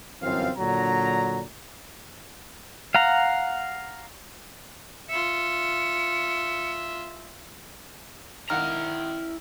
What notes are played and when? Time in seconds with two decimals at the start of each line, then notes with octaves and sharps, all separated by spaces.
0.22 G1 F#2 E3 C4 F4 F5
0.59 A#2 D3 F#3 D4 A#5
2.95 F5 F#5 A#5
5.09 F4 E5 C#7
8.50 D#3 E4 F5 F#5 A#5 F6